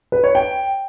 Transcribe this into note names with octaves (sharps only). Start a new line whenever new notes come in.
B4
C#5
G5